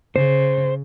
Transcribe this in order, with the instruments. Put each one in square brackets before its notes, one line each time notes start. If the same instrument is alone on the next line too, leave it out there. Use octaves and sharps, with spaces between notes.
[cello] C#3 [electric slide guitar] C5